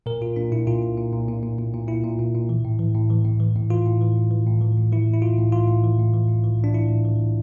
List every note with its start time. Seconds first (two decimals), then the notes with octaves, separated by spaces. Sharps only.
0.06 A#2 A#4
0.21 A#2 F4
0.36 A#2 D4
0.52 A#2 E4
0.67 A#2 F4
0.82 A#2
0.97 A#2
1.13 A#2
1.28 A#2
1.43 A#2
1.59 A#2
1.74 A#2
1.88 A#2 E4
2.04 A#2
2.19 A#2
2.34 A#2
2.49 E3
2.65 A2
2.79 E3
2.95 A2
3.10 E3
3.25 A2
3.40 E3
3.56 A2
3.70 E3 F4
3.86 A2
4.01 E3
4.16 A2
4.31 E3
4.47 A2
4.61 E3
4.77 A2
4.92 E3 E4
5.08 A2
5.14 E4
5.22 E3 F4
5.38 A2
5.52 E3 F4
5.68 A2
5.84 E3
5.99 A2
6.13 E3
6.29 A2
6.44 E3
6.59 A2
6.64 D4
6.74 E3 E4
6.89 A2
7.05 E3
7.20 A2